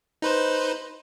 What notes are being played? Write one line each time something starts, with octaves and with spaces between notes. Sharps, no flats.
D#4 B4 C5